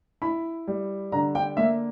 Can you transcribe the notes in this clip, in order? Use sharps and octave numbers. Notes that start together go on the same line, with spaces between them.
E4 B5
G3
D3 A#5
G5
A#3 E5